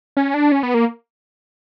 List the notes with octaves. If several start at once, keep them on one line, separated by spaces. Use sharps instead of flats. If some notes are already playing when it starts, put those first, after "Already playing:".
C#4
D4
C#4
B3
A#3